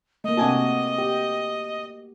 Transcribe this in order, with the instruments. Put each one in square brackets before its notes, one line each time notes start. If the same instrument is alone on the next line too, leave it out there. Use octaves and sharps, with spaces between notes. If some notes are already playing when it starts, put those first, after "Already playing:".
[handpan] A3 A#3 [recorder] D#5
[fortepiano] C3 G#5 A5 [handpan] F#4
[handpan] G4